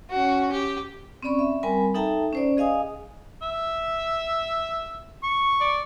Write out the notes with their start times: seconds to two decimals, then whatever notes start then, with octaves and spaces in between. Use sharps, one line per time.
0.10 C#4 F#4
0.52 G4
1.23 C4 C#4 D5 B5 C#6
1.39 E5
1.63 G3 C4 A#4 G#5 B5
1.94 D#4 A4 E5 G5 A5 A#5
2.33 C#4 C5 D5
2.57 G#4 D#5 F5 G#5 D#6
3.42 E5
5.23 C#6
5.61 D5